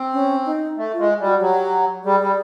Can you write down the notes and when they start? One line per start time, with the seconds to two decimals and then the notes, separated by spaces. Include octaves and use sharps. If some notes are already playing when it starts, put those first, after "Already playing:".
Already playing: C4
0.13 C#4
0.46 D#4
0.77 A3
0.94 F4
0.99 G#3
1.20 G3 F#4
1.40 F#3 G4
2.05 G3 G#4
2.21 G3